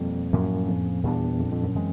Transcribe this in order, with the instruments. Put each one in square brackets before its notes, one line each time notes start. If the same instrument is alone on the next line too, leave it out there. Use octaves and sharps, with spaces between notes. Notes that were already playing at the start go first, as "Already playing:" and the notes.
Already playing: [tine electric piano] F2 [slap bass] B2 G3 A#3
[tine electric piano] F#2 [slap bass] A2 F3 A#3 C#4
[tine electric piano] F2
[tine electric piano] E2 [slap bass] A#2 G3 B3 D4
[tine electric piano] F2
F2
F#2
[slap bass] E3 G#3 C4